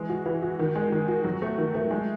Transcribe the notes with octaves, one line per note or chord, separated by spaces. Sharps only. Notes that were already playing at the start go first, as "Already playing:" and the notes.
Already playing: E3 G#3
F#4
E3
F#4
D#3
G#3
D#3
F#4
F#3
A3
D#3
A3
G#3